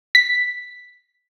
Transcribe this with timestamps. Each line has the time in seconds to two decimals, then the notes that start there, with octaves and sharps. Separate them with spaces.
0.15 B6